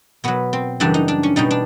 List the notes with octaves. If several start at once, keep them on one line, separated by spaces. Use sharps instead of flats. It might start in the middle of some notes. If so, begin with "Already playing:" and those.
B2 F#3 B3
C4
F#2 C#3 E3 G3 D4
D#4
D4
C#4
B2 G3 D#4
D4